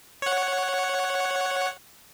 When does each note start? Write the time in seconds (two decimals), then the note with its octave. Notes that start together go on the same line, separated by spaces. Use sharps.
0.22 C#5 F#5